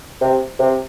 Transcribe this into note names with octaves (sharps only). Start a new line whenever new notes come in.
C3
C3